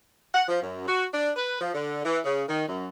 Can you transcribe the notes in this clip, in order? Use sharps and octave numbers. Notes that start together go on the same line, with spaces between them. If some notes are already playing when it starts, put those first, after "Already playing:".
F#5
F3
F#2
F#4
D4
B4
F3
D3
E3
C#3
D#3
F#2